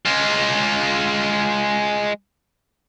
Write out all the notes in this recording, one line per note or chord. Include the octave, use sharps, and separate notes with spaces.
G#3 F4